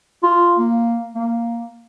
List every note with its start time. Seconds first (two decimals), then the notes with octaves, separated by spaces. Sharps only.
0.23 F4
0.59 A#3
1.15 A#3